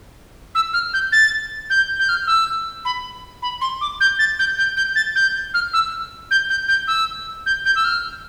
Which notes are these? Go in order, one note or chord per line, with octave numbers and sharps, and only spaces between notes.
E6
F6
G6
A6
G6
G6
F6
E6
B5
B5
C6
D6
G6
A6
G6
G6
G6
A6
G6
F6
E6
G6
G6
G6
E6
G6
G6
E6
F6